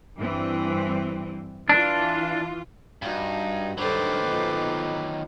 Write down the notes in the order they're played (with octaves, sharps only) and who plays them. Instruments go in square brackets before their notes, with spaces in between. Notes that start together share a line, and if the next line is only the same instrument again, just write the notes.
[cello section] G2 E3 C4
[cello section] E3 F4 [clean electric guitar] D4
[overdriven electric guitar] G2 [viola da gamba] D#4 F#4
[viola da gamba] G2 D4 [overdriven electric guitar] D#3 F#3 [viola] A4 C5 [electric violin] B4 D6
[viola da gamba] B3 D#4 F4